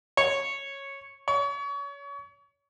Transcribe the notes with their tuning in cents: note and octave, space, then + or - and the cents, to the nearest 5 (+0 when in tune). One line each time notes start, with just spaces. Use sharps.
C#5 -10
C#5 +30